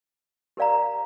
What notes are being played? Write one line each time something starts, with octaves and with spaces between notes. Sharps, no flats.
G4 A#4 D5 F5 A#5